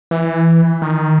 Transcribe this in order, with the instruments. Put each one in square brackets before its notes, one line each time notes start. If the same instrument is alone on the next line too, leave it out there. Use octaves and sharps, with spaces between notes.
[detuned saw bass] E3
D#3